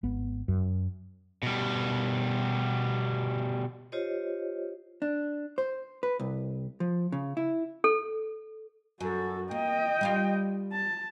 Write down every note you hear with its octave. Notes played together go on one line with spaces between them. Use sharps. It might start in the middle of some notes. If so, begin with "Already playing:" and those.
G#1 B3
F#2
B2 G3
F4 G4 C5 C#5 D#5
D4
C5
B4
C2
F3
C#3
E4
A4
F#2 F#4 A4
A#3 D#5 G5
G3 F4 F5
A5